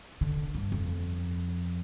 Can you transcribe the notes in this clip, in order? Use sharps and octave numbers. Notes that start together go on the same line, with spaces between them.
D3
G2
F2